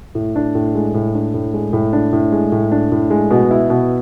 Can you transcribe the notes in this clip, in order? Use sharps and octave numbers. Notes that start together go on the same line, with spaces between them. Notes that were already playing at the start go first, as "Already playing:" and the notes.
A2
D4
A2
G#3
A2
D4
A2
G#3
A2
D4
A2
G#3
A2
D4
A2
G#3
B2
E4
B2